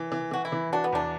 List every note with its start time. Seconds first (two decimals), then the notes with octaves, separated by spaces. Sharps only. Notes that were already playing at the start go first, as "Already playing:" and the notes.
Already playing: E3
0.12 E3
0.31 E3 F#4
0.45 E4
0.52 E3
0.72 D4 F#4
0.84 B3
0.93 E2 D4